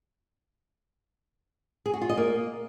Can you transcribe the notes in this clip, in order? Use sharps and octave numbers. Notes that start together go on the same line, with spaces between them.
G#4
F#4
F4
D#5
A#3